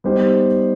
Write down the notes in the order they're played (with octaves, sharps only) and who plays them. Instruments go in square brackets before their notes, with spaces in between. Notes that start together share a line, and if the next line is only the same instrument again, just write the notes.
[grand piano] G3 B3 D#4 G4 C5